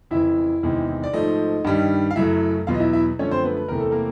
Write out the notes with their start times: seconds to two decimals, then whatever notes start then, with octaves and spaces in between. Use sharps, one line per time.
0.11 F2 C#3 E3 E4 E5
0.63 E2 C3 D#3 G#3
1.03 D5
1.13 G#2 F3 A3 D#4 D#5
1.64 G2 D#3 G3
2.11 F5
2.16 F#2 C#3 F#3 A3 E4 E5
2.67 E2 B2 F#3 F4 F5
2.74 D#5
2.80 E4 E5
2.93 E4 E5
3.19 F#2 D3 F3 A3 C#4 C#5
3.31 C4 C5
3.44 B3 B4
3.57 B4
3.68 E2 C3 E3 A3 A#4
3.80 A4
3.91 A#3 A#4